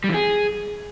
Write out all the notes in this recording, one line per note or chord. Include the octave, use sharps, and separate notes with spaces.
G3
E3
G#4